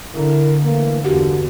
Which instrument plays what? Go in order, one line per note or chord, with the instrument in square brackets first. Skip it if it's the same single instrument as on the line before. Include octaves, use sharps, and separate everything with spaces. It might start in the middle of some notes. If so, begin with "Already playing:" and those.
[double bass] D3 [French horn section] E4 A#4
[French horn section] E3 A3 A#3
[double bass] G1 E2 [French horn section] G2 D3 [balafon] F#4 G4 F#5